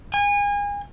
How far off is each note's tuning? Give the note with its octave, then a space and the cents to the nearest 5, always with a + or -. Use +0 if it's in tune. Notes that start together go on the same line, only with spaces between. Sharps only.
G#5 -30